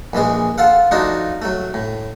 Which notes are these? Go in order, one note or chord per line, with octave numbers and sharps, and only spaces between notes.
A#1 E3 G#3 G#4
F4 A4 F5 F#5
F3 A3 D4 D#4 F4 F#4
F#3 A3
A2